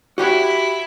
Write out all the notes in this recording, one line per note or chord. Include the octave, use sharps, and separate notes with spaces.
E4 F#4 G4 F#5